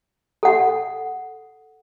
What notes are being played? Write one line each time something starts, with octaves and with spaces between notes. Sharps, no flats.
A4 F#5